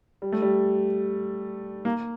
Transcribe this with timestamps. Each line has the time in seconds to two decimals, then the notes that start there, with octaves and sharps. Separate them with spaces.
0.22 G3
0.32 A3
0.42 G3
1.85 A#3